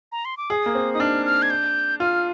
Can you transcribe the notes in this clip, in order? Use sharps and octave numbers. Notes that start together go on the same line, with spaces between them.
A#5
C6
D6
G#4 D#6
A#3
C4
D#4 D#6
D4 F6
F6
G#6
G6
F4 F6